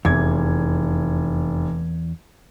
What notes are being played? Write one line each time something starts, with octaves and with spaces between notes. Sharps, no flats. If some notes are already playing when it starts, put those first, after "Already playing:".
F1 E2 G#6